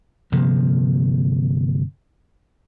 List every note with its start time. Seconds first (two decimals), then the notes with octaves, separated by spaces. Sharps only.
0.32 G1 C3 F3 A#3